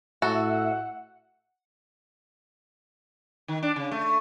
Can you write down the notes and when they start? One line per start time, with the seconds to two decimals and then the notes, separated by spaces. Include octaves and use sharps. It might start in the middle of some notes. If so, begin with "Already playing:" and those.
0.22 A2 F#4 A4 E5 F#5
3.48 D#3
3.63 D4
3.76 C#3
3.91 A3